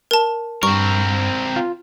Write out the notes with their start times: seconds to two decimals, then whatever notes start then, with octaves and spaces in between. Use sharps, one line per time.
0.11 A#4 A5
0.63 G2 C4 A#4 C#6
1.56 F4